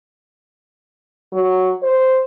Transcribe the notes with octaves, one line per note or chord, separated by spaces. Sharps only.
F#3
C5